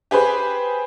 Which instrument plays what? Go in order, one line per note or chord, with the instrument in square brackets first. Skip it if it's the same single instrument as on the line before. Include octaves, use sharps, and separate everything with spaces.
[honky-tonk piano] G4 G#4 B4 C5